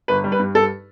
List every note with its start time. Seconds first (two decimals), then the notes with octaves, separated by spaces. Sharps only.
0.08 G1 B4
0.24 G3
0.32 B4
0.39 G2
0.55 G2 A4